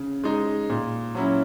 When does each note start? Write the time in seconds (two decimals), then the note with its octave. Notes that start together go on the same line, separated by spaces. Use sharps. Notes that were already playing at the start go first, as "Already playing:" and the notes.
Already playing: C#3
0.24 G#3 D#4
0.69 A#2
1.15 F#3 C#4 E4